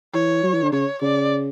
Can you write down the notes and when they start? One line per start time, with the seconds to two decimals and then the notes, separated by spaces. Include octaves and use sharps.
0.14 E3 C#5
0.43 F#3
0.54 E3
0.63 D3
0.73 C#3 C#5
1.02 C#3 D5